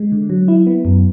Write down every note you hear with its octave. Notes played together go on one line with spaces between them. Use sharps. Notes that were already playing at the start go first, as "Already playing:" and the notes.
Already playing: G#3
D3
F#3
E4
B3
F#2